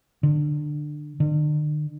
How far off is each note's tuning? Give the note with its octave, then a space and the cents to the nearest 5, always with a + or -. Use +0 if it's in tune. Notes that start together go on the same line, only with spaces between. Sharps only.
D3 +25
D3 +45